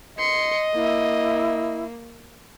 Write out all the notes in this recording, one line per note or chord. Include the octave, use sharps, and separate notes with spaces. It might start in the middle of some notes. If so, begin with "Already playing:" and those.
D#5 C6 C#7
A#3 E4